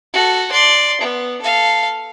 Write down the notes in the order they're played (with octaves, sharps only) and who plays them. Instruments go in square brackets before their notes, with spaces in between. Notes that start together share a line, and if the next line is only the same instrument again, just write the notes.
[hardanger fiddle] F#4 A4
D5 C6
B3
A4 F5